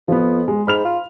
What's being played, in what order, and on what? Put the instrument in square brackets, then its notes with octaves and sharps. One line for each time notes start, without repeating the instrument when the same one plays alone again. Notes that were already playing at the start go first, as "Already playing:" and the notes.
[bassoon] F2 [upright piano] F3 B3
[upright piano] G#3
[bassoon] G#2 [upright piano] B5 F6 F7
[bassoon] F4